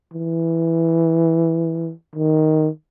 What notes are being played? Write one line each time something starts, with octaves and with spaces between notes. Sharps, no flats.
E3
D#3